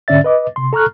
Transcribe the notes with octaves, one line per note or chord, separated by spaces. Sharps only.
G#2 D3 C#4 D5 E5 A6
B4 D#5 D6
C3 C6
A4 A#5 C#6 F6 F#6